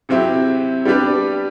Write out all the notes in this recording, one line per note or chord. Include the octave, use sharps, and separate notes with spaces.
C3 F#3 C4 E4 G4
G3 B3 D4 G4 B4